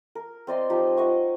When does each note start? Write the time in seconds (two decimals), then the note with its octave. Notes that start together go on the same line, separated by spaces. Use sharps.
0.15 A#4
0.47 C4 D5 D#5 C6
0.70 F3 D#4 G4
0.97 D#5 F#5 C#6